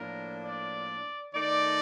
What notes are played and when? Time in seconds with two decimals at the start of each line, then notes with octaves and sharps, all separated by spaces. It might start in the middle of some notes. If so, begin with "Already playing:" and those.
Already playing: A2 F3 A#3 D4 A#4
0.45 D5
1.33 D#3 A3 D#4 D5